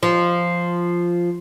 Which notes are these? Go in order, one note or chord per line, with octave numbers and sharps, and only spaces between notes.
F3